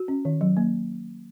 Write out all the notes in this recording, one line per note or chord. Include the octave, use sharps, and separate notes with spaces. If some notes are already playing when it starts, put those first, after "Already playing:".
Already playing: F#4
C#4
D#3
F#3
A#3